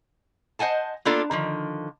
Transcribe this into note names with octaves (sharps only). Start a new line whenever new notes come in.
C5 D#5 F#5 G#5 A5
A#3 B3 D4 F4 A4 D5
D3 D#3 F3